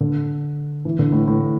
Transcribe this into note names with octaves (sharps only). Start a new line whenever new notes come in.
D3
E3
D3
A2
A2